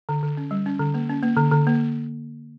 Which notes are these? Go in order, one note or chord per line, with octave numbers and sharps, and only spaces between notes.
D3
D3
C#4
G3
C#4
D3
A#3
C#4
A#3
D3
D3
A#3